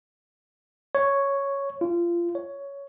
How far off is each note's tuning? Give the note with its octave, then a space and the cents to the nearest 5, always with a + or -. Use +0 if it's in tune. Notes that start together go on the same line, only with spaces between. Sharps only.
C#5 +0
F4 -25
C#5 +10